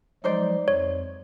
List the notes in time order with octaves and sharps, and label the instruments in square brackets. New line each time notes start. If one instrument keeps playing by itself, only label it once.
[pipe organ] F3 F#3 G#3 [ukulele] D#4 C5 D5
[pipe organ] F2 [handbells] C#5